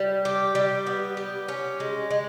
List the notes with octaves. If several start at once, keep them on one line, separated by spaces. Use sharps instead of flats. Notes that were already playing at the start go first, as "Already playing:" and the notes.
Already playing: G3
G4
G3
B3
G4
C#4
G#3
G#3